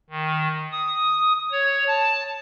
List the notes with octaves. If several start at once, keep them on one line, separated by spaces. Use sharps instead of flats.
D#3
D#6
C#5
A5